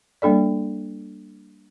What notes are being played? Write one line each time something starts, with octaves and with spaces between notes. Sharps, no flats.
G3 A#3 D4 A4 D5